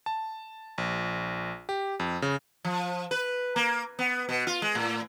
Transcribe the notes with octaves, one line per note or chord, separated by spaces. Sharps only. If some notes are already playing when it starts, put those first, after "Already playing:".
A5
A#1
G4
F2
C#3
F3
B4
A#3
B3
B2
F4
G#3
A2